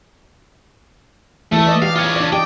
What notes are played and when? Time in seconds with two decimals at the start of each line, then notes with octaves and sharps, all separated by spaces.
1.52 E3 A3 A4
1.66 D5 D#5
1.82 G4 F5
1.95 F4 C#5
2.16 D4 D5
2.32 G4 D#5 G5